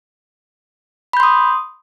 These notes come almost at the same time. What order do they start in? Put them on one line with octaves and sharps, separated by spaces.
B5 G6 C6 D#6